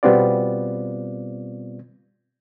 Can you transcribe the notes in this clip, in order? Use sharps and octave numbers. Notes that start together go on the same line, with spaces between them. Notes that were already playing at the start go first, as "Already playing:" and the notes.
B2 G3 B3 C4 F4 D5